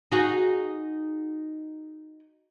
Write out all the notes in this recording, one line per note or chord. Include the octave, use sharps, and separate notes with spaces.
D#4 F#4 G#4